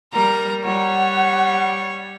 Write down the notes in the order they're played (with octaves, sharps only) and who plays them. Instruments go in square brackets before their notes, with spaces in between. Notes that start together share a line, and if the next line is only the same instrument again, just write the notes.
[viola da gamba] G3 [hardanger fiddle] A#4 A#5
[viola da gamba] G3 [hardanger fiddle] C#5 [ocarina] F#5